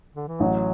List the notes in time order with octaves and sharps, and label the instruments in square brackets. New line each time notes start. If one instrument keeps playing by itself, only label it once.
[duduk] D3
E3
[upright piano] A1 [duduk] F#3